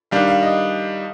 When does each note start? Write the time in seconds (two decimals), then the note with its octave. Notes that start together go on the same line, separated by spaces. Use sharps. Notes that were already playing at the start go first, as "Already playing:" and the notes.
0.11 D#3 G3 D4 F5
0.27 F5
0.42 D#5